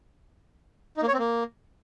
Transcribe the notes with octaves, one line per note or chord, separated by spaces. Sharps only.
D#4
A#3
C#5
C4
A#3